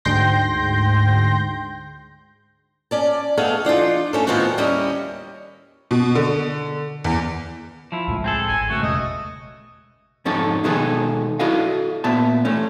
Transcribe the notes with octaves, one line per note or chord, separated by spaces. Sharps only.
D2 G#2 G5 C6 G6 A#6
C#4 D5 A5
A3 B3 G#4 A4 D#5 F5
E3 D4 D#4 F4
A3 C#4 A4
A2 D#3 F3 B3 C4 F#4
D#2 G3 C#4 E4 D#5
B2
D3
E2
F3 E4
C#2 A2 G#3
C4 G#4 A4
G#1 G#5
C#2 A3 F#4
E2 B2 G#3 D#5
F2 G#2 C#4 D#4 A4
B2 D#3 G#3 B3 G#4 A4
E4 F#4 A4 D#5 F5
A#2 B3 E5 A5
A3 C#4